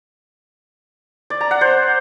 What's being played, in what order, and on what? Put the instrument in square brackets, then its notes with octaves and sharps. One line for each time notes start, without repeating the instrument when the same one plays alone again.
[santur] D5
A#5
F#5
C5